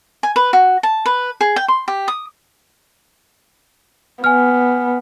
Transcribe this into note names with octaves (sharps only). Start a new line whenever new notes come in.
G#5
B4
F#4
A5
B4
G#4
G5
C6
G4
D#6
B3 G#5 F6